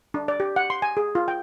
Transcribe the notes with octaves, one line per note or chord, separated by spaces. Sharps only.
D4
D5
G4
F#5
C6
G#5
G#4
F4
G5